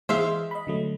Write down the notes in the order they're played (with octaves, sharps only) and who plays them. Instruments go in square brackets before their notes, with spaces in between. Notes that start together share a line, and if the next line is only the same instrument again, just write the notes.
[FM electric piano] E3 [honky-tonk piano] G#3 [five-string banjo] C5 E5 F5
[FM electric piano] D#5 B5
D3 F#3 A3